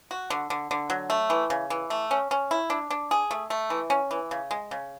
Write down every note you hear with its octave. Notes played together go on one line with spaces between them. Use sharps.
F#4
D3
D3
D3
F#3
A3
E3
C#3
E3
A3
C#4
C#4
E4
D4
D4
G#4
A3
A3
E3
C#4
E3
C#3
G#3
C#3